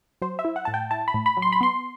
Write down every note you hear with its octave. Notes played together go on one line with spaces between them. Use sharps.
F#3 C5
E5
E4
F#5
A2 A5
G5
E4 A5
B5
A2
B5
F#3
C6
B5
B3 C6